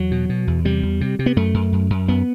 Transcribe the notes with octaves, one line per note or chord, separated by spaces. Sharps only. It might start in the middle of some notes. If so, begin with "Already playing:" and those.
Already playing: E2 F#3
B2
B2
E2
C3 G3
E2
C3
C3
B3
F#2 A3
F#2
F#2
F#2
F#2 B3